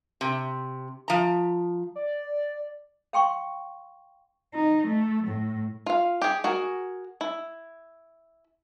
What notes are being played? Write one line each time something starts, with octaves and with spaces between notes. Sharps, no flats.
C3
F3 A#5
D5
F5 G5 C6 C#6
D#4
A3
A2
F4 F5
G4 G#4
F#4 G#4 A#4
E4